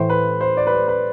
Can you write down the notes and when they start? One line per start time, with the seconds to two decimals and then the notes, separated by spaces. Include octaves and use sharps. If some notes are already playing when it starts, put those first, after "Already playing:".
Already playing: A2 E3 C5
0.10 B4
0.41 C5
0.57 D5
0.67 B4
0.73 C5
0.88 B4